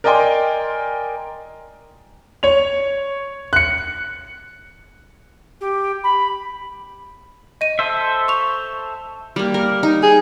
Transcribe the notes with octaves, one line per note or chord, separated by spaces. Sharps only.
A#4 D5 D#5 G5 G#5 C6
C#5 F7
F#6 C#7
G4
B5
D#5 D#7
A4 C5 E5
C#6 F7
G3 A#3
A#4
D#4
G#4